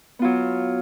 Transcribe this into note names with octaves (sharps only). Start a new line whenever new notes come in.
F#3 B3 F4